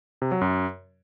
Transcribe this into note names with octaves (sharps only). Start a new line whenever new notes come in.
C3
F#3
F#2